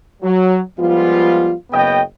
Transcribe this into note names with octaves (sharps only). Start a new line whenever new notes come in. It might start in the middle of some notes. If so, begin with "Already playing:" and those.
F#3
F3 G3 G#3 B3 F4
F#1 C#3 B3 D#5 G5